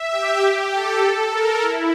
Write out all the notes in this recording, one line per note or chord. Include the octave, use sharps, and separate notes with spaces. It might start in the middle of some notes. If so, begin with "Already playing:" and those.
Already playing: E5
G4
A4
A#4
E4